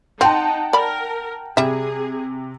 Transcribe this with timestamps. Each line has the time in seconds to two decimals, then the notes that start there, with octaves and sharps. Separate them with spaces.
0.21 C4 D#4 F#5 G5 A5
0.73 A#4 D5 B5
1.57 C3 G3 G#4 E5